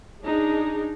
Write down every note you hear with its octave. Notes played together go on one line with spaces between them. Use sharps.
D4 D#4 G#4